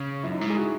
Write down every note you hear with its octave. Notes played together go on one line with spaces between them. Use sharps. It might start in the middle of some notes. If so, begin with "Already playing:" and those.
Already playing: C#3
F#2 E4
D#4
G#2 E4
G#4
F#4